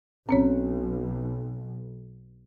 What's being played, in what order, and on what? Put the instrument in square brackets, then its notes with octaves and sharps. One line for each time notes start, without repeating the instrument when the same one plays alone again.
[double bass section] B1 [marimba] C4 C#4 C#5